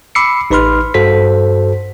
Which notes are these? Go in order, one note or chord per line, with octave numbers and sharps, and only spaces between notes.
B5 D6 E6 C7 C#7
A1 D#4 B4 B5 C6 F6
G2 F#4 A4 C5 B6